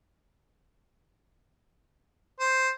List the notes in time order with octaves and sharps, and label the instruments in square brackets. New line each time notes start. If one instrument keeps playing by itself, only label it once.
[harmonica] C5